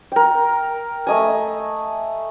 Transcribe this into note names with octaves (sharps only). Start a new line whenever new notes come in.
A#4 G5
A3 D#5 G#5